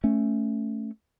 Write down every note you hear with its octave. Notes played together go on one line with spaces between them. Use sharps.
A3 C#4